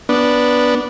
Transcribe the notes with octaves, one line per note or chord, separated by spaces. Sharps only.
B3 D4